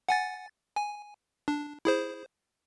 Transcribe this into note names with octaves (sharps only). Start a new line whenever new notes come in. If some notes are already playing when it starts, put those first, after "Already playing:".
F#5 G#5 A6
G#5
D4
E4 G#4 C5